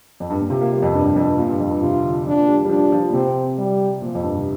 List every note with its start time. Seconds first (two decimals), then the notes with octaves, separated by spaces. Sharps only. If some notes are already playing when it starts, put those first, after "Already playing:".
0.20 F2
0.30 G2
0.40 A#2
0.50 C3 F4
0.61 A#3
0.72 G3
0.82 F2
0.94 G2 D4
1.05 F2
1.16 F2
1.27 G2
1.38 A#2 F4
1.49 G2
1.59 F2
1.71 G2
1.82 C3 F4
2.03 D3
2.26 F3 D4
2.40 A#3
2.48 G3
2.65 G3
2.69 F3 D4
2.92 F3
3.09 A#2
3.13 C3 C4
3.58 G3
4.02 A#2 F3
4.15 F2
4.23 G2
4.37 C3